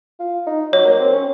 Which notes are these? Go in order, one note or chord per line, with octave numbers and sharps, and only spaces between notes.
F4
D#4
F#3 C#5
A#3
C4
C#4